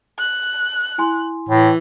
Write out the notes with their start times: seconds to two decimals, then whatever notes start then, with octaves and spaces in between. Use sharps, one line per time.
0.18 F#6
0.98 E4 G#5 C6
1.49 A2 E3